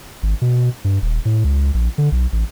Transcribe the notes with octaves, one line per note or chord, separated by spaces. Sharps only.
G#1
B2
G2
D#1
A2
C#2
A#1
D3
B1
A1